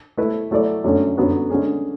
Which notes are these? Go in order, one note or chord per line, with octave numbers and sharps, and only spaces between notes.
A3 E4 B4
F#3 A3 E4 A4 D5
F#2 D3 A3 C#4
F#2 D3 F#3 B3 F#4
D3 G#3 C#4 G#4